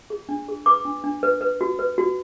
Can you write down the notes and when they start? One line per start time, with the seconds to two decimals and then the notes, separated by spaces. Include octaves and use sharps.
0.10 G#4
0.29 D4
0.48 G#4
0.66 B4 D6
0.85 D4
1.04 D4
1.23 B4
1.41 B4
1.61 F#4
1.79 B4
1.98 F#4